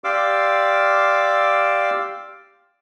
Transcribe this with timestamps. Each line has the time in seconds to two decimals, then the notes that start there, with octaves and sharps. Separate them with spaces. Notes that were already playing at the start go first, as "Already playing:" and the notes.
0.04 G4 D5 F5 C6 D6 E6